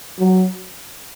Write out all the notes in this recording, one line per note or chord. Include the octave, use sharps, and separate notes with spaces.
F#3